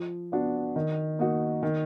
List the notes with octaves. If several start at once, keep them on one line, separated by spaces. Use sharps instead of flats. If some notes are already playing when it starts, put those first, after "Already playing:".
Already playing: F3
B3 D4 F#4
D#3
A#3 D#4 F#4
D#3